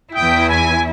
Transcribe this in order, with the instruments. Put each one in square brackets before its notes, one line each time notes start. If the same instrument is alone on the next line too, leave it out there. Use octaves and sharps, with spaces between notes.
[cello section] E2 E4 [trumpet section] G5 D#6
[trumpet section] G#5